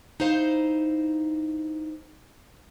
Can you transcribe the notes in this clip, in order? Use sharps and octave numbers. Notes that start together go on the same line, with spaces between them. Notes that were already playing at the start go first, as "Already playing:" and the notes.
D#4 E4 C5 F5